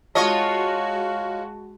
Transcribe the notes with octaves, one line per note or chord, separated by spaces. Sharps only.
G#3 F4 F#4 C#5 D#5 A5